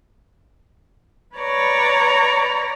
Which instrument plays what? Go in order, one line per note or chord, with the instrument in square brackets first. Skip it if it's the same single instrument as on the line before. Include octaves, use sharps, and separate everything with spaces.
[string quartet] B4 C#5 D5 A#5